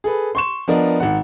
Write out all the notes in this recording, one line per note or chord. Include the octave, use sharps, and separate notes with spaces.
G#4 A4 B4
C6 C#6 E7
F3 B3 D4 A#4 D#5
G#1 F#5